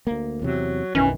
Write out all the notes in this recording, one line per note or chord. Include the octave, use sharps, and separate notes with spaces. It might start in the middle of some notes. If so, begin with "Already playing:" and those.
D2 A#3
E2 C3 F#3
B1 F#2 D#3 E3 C#4